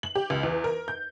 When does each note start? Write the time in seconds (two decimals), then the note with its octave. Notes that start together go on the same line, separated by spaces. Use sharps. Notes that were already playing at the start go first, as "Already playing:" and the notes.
0.03 F#7
0.15 G4
0.30 C#2
0.43 E2
0.64 A#4
0.88 G6